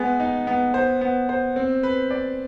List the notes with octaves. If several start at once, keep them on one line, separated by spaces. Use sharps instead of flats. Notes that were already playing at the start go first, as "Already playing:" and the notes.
Already playing: G#3 B3
D#4
B3
C5
B3
C5
C4
B4
D5